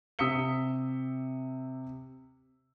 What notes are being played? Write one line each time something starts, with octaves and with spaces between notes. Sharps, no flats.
C3 D#6 E6 B6 C#7 G7